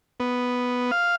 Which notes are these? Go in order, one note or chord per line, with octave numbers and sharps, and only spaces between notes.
B3
F5